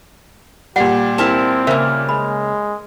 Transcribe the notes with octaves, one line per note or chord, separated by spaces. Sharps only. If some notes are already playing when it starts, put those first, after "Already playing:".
A#2 G3 G4 F#5
C4 E4 A#4 A5
C#3 A#3 A#4 C5 E5
G#3 B5